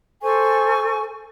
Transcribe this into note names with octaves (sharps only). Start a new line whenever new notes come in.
A4 C5 G#5 C#6